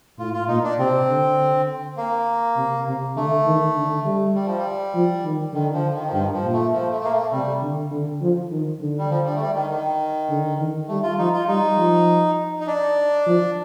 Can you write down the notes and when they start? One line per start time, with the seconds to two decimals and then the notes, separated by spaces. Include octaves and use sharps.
0.18 A2 F4
0.34 F4
0.48 A#2 D#4
0.63 D4
0.78 C3 C4
1.08 D3
1.97 A#3
2.56 C3
2.86 C3
3.16 D3 A3
3.46 D#3
3.75 D3
4.05 G3
4.35 G3
4.46 F3
4.57 G3
4.94 F3
5.24 D#3
5.53 D3 D#3
5.73 F3
5.94 D#3
6.07 F3
6.13 G2 D#3
6.33 F3
6.43 A#2
6.53 A3
6.73 F3
6.92 A3
7.05 A#3
7.12 A3
7.32 C3 G3
7.62 D3
7.91 D3
8.21 F3
8.51 D#3
8.81 D3
8.98 G3
9.10 F3
9.25 G3
9.35 A3
9.41 G3
9.55 D#3
9.70 D#3
10.29 D3
10.59 D#3
10.88 G3 A3
11.03 F4
11.18 F3 D#4
11.33 F4
11.48 G3 D#4
11.78 F3
12.60 D#4
12.67 D4
13.26 F3